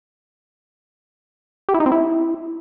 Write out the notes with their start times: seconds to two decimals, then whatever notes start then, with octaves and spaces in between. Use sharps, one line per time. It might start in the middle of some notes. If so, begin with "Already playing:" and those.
1.69 G4
1.74 E4
1.80 D#4
1.86 C4
1.92 E4